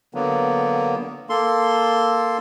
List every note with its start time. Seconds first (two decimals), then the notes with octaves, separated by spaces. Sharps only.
0.14 D3 F#3 A#3 B3
1.30 A#3 A4 C6